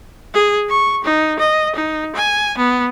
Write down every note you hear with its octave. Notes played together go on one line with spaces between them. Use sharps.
G#4
C#6
D#4
D#5
D#4
G#5
B3